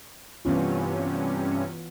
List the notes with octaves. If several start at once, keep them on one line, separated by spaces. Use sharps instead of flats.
G2 C3 E3 B3 C#4 F4